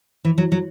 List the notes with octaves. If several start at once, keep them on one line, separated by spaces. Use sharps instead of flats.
E3
F#3
F#3